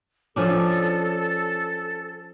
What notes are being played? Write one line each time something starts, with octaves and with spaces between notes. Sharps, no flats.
F3 C#4 D4 A4